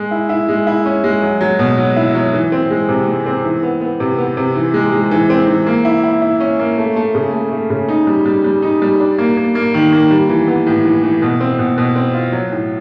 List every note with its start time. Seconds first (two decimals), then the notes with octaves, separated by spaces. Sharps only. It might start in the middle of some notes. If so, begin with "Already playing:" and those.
Already playing: G#3
0.11 E4
0.29 E4
0.48 G#3
0.67 E4
0.85 C#4
1.04 G#3
1.22 F#3
1.41 F#3
1.59 B2
1.78 F#3
1.96 E4
2.15 F#3
2.33 E3
2.52 C4
2.70 G#3
2.89 C3
3.07 G#3
3.26 C4
3.45 E3
3.63 B3
3.81 B3
4.00 C3
4.18 B3
4.37 C3
4.56 E3
4.74 G#3
4.92 G#3
5.11 E3
5.30 C4
5.48 E3
5.66 A#3
5.85 E4
6.04 E4
6.22 E4
6.40 C#4
6.59 A#3
6.78 A3
6.96 A3
7.15 C#3
7.33 A3
7.51 A3
7.70 C#3
7.88 D#4
8.07 G3
8.26 G3
8.44 G3
8.62 D#4
8.82 G3
9.00 D4
9.18 A#3
9.37 A#3
9.55 A#3
9.74 D#3
9.92 A#3
10.11 G3
10.29 E3
10.48 B3
10.66 A2
10.85 E3
11.04 E3
11.22 B2
11.41 C4
11.59 B2
11.78 B2
11.96 C4
12.14 F4
12.32 F#3
12.52 A2